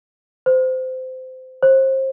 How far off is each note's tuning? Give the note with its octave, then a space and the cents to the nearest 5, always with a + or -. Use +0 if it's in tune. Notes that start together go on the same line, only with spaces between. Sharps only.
C5 -20
C5 +30